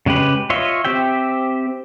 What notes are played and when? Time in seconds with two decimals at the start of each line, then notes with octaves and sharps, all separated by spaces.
0.06 C#3 G#3 G4 B4
0.50 F4 C#5 D#5 E5
0.85 C4 G4 E5 G5